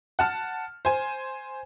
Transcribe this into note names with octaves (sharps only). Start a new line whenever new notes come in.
F#5 A5 F6
C5 G#5